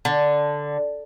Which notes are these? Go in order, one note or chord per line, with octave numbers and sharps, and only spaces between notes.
D3